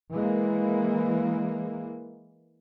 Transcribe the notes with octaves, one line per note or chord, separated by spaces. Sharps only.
E3 G#3 A#3